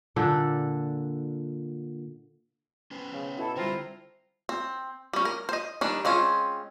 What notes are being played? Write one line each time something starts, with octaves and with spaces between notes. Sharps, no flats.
A#2 D3 D4 A4
C#4 B4 C5
C#3
B2 E4 A4
D3 G3 C4 E4 F4 A#5
C4
G3 C#4
A#4
C5 D#5
D#3 G3 D4
G#3 C4 C#4 F4